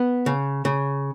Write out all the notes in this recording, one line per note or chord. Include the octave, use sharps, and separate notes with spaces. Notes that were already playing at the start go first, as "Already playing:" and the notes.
Already playing: B3
C#3
C#3